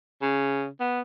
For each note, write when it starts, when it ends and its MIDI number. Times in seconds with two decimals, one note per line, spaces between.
0.22 0.67 49
0.80 1.01 59